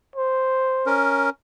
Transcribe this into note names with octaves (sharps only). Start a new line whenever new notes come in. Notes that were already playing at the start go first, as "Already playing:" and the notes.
C5
C#4 A#4